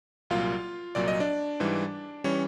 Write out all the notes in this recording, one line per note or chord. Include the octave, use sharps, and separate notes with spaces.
C2 A#2 F#3 F4 F5
C2 A#2 F#3 D5
D#5
D4 D5
G#2 E3 G3
E3 G3 C#4 C#5